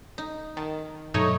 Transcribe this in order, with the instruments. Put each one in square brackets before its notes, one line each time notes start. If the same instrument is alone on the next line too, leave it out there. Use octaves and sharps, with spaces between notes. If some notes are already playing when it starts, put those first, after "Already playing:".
[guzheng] D#4
[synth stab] D#3 [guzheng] A5
[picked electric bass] G2 B2 F#3 [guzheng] A3 [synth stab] D#4 C#5